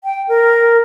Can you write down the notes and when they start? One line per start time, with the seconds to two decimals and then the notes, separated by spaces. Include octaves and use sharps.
0.04 G5
0.28 A#4